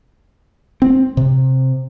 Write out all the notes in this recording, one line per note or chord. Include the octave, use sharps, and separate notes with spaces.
C4
C3